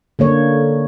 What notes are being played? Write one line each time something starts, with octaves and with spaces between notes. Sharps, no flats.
D3 A#3 C#5